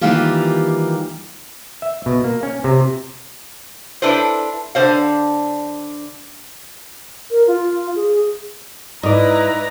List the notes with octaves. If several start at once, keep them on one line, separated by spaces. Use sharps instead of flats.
D#3 E3 G3 A#3 F4 G4
E5
B2
A#3
C#4
C3
D4 E4 A4 B4 C5
D3 C5 F5
A#4
F4
G#4
G#2 E4 B4 D5 D#5 A#5